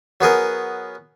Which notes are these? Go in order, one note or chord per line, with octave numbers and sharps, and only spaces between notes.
F#3 B3 G#4 A#4